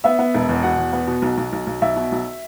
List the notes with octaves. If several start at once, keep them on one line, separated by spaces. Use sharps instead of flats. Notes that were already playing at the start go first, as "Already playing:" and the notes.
B3 E5
B3
E1
E2
B2 F#5
E2
B3
B2
B1
B1
B1
B1
B1 E5
B2
B1